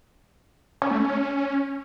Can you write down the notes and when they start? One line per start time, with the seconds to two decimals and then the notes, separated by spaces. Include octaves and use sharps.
0.82 C#4
0.91 A3
1.00 C#4